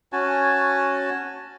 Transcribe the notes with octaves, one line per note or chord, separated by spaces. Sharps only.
C#4 F#4 G#5 A5